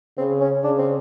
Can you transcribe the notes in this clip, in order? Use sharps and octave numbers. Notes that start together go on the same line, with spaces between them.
C#3 C4
C#4
C#3 D4
C4